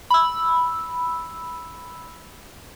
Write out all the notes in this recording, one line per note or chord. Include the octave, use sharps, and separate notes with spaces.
B5 E6